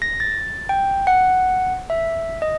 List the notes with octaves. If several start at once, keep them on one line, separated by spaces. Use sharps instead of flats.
A#6
A6
G5
F#5
E5
D#5